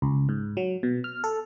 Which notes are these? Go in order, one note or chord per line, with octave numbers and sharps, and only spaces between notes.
C#2
G#2
F#3
B2
F6
A4